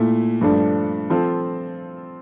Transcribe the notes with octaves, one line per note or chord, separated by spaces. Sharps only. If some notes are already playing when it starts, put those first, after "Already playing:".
Already playing: A#2 A3 E4
G2 F3 A3 D4 A4
F3 C4 F4 A4